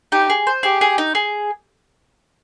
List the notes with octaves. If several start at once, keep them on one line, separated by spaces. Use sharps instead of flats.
D#4 G4
G#4
C5
G4 G#4
G#4
D#4
G#4